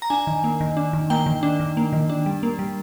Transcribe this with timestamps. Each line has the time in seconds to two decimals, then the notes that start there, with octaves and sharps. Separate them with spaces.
0.02 A#5
0.10 D4 G#5
0.27 D#3
0.44 A#3
0.61 D#3
0.77 D4
0.93 D#3
1.10 A#3 G5
1.26 D#3
1.43 D4
1.60 D#3
1.77 A#3
1.93 D#3
2.09 D4
2.26 G3
2.43 A#3
2.59 G3